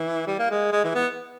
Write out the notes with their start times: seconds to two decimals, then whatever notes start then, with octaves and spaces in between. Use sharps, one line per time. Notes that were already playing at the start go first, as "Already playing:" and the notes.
Already playing: E3
0.27 G3
0.39 A#3
0.50 G#3
0.72 G#3
0.84 E3
0.95 B3